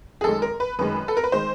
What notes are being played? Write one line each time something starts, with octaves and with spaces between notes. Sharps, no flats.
G#4
F#2 D#3 G#3 A4
A#4
B4
F#2 D#3 G#3 B4
A4
A#4
B4
D#3 G#3 C5